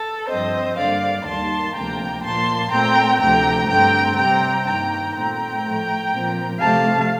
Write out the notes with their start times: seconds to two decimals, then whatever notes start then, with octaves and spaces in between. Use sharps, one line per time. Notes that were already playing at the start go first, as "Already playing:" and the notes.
Already playing: A4
0.28 G2 F3 C4 C5 D#5
0.77 G2 D3 G3 A#3 D5 F5
1.25 D#2 D#3 G3 A#3 A5 C6
1.74 D2 C3 F3 A#3 G5 A#5
2.23 A#2 F3 A#3 A5 C6
2.71 A#2 A3 C4 G5 A#5
3.20 D2 C3 F3 A3 G5 A#5
3.68 G2 D3 A3 C4 G5 A#5
4.17 C3 G3 C4 G5 A#5
4.66 G2 D#3 A#3 G5 A#5
5.14 A#2 A3 C4 G5 A#5
5.63 A2 F3 A3
6.12 A#2 F3 C4
6.60 C3 F3 A3 F5 A5